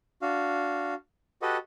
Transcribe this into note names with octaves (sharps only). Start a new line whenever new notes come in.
D4 F#4 F5
F#4 G4 A4 B4 D#5 F#5